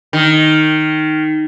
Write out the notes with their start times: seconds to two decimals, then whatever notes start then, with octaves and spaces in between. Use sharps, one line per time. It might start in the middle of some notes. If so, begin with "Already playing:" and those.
0.13 D#3